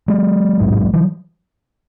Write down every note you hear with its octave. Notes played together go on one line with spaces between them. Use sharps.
F#3 G#3
A1 G#2
E3 F#3